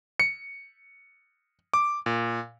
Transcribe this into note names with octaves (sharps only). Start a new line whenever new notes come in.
C#7
D6
A#2